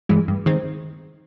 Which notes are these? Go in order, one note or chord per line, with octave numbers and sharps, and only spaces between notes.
G2 E3 G#3
G2
D#3 G#3 C4